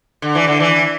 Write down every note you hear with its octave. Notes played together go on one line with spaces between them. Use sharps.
D3
E3
D3
E3